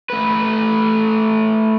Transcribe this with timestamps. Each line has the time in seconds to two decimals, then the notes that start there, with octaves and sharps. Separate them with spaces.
0.10 A3 B4